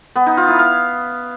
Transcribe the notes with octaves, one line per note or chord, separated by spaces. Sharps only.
B3
D#4
F4
E4
F5